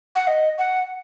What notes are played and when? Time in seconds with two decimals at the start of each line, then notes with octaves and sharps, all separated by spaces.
0.16 F#5
0.27 D#5
0.58 F#5